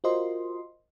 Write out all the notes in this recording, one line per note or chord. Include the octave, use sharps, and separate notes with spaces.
F4 F#4 A#4 C5 D#5 C6